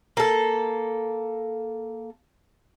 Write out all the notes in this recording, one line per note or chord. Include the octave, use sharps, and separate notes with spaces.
A#3 A4